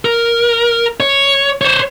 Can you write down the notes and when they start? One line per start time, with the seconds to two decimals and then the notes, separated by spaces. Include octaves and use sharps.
0.05 A#4
1.00 C#5
1.61 C5 C#5